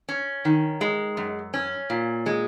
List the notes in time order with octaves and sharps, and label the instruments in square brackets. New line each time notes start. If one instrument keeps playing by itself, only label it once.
[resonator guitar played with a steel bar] C#4
D#3
G#3
F#2
C#4
A#2
G#3